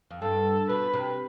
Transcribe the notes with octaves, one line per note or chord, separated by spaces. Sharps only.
F2
G2 A4
B2 B4
C3